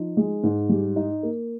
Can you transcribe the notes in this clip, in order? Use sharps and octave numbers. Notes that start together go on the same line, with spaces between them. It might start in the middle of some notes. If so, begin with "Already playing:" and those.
Already playing: F3 D#4
G#3
G#2
G3
D#4
A#3